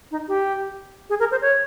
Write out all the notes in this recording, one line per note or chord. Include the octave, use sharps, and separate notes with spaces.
D#4
G4
G#4
A#4
C5
C#5